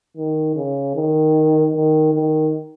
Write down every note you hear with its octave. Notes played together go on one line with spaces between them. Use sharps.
D#3
C#3
D#3
D#3
D#3